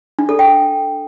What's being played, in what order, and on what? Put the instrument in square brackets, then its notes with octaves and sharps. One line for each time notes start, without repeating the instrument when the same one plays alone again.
[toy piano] D4
A4
G5